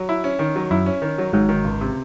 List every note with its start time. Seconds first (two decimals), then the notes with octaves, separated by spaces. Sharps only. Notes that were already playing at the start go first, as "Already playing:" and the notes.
Already playing: F#3
0.09 E4
0.24 C#4
0.39 D#3
0.56 F#3
0.71 F#2 E4
0.86 C#4
1.02 D#3
1.18 F#3
1.33 G#1 G#2 F#3
1.49 D#3
1.64 C#2
1.81 C3